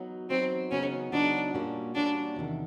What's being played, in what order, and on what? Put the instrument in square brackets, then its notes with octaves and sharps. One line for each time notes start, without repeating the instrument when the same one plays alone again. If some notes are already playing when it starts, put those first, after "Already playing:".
Already playing: [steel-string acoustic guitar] F#3 B3 D#4 F#4
[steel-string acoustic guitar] F#3 B3 D#4 F#4 [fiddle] C4
[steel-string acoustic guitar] C#3 F#3 B3 D#4 F#4 [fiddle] C#4
[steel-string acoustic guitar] C#3 F#3 B3 D#4 F#4 [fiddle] D4
[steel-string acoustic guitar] A#2 G3 A#3 C#4 F#4
[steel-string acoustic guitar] A#2 G3 A#3 C#4 F#4 [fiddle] D4
[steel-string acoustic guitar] E2 C3 D#3